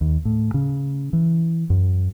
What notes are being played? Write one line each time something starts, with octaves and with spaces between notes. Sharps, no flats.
D#2
A2
C#3
E3
F#2